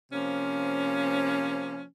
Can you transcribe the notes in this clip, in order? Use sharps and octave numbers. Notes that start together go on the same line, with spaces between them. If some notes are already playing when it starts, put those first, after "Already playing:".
C3 F3 A#3 C#4